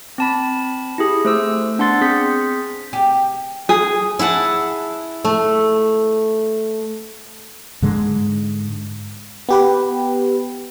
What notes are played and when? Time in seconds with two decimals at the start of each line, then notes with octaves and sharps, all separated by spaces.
0.18 C4 A5 B5
0.98 E4 G4 G#4
1.25 A3 C5 E6
1.78 B3 D4 F#5 C6 A6
2.01 C4 G#4 G6 B6
2.93 G4
3.69 G#4
4.19 E4 G#4 F#5 A5
5.25 A3
7.82 G#2 D3 G#3
9.49 B3 G4 B4